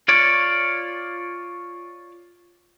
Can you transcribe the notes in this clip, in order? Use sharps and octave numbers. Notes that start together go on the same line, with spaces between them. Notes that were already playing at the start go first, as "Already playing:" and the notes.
F4 C#5 D5